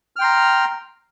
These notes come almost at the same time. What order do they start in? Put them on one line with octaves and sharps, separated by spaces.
F6 G5 C6 A#5